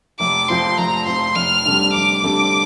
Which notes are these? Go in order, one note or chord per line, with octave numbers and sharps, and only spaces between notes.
F1 D6
F2 F3 C4 C6
F1 A#5
F2 F3 C4 C6
F1 F6
F2 D3 G3
F1 D6
F2 D3 G3